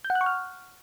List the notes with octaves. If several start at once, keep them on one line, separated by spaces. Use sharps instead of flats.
G6
F#5
F#6
C#6
F6